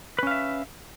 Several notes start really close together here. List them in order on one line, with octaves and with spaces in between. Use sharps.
B4 C#4 F5 E5